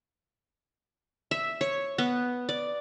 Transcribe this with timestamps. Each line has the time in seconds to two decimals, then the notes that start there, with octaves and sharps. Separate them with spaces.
1.31 E5
1.61 C#5
1.98 B3
2.49 D5